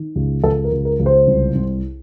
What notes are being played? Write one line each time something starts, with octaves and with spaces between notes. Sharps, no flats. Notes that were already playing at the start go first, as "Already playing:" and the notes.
Already playing: D#3
C#2
C#2 A4
A#4
C#2
A#4
C#2
C5
C2
C2